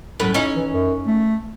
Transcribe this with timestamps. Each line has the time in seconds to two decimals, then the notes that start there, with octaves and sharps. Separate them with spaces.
0.20 F#2 A2 B4
0.34 C#4 D#4 E4
0.56 E3
0.71 F#2
1.07 A3